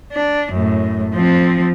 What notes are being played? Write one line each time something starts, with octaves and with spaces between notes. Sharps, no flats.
D4
F#2 A2
F3 C4